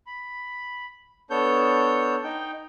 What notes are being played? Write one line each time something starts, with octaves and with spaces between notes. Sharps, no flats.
B5
B3 D4 A4 C#5 G6
D#4 G5